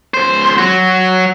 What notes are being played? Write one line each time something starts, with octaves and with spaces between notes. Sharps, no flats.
C#2 C5
F#3 F#4